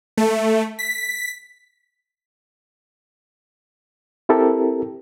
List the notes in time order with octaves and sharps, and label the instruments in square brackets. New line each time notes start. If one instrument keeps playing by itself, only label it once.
[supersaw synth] A3
B6
[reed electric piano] C4 E4 G4 A4 A#4